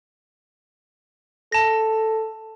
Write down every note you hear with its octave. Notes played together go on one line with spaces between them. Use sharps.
A4 A5 A#6